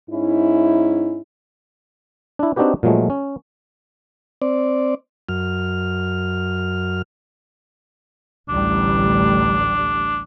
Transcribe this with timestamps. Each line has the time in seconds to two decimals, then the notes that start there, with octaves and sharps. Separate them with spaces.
0.10 G#2 C#4 D#4 E4
2.39 D4 E4
2.56 C4 D4 D#4 F#4 G4 B4
2.83 A#2 F3 F#3 G#3 A3
3.10 C#4
4.42 C4 D5
5.29 F#2 F6
8.49 A1 D2 G3 D4